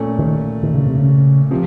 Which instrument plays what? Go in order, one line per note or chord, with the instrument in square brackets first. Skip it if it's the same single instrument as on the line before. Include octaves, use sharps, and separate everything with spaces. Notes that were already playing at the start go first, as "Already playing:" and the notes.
Already playing: [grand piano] A#2 A3 C#4
[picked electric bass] D#3
D#3
C#3
C3
C#3
[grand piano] C3 F3